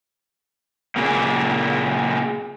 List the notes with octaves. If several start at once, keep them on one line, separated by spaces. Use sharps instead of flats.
A#2 C#3 A#3